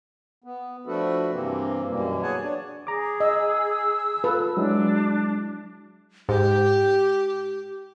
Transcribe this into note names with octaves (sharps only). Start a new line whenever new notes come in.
B3
F3 A3 D4 F#4 A4 B4
G2 C3 E3 A#3 C4
F#2 B2 E3 G3 A#3
G#4 C#5 F#5 G#5 A5
D4 C#5 D5
G#4 A#5 D6
D#5 E6
F4 A4 B4
F#3 G#3 D4 E4
G#2 G4